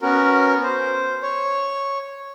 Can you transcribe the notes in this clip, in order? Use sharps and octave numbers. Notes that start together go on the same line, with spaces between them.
B3 C#4 F#4 A#4
C5
C#5